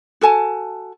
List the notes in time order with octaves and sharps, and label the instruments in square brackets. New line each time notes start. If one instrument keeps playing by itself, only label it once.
[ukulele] F#4 A4 G#5 A5